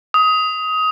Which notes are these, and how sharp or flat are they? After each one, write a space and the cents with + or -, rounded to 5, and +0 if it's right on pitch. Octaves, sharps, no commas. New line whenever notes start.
D#6 +20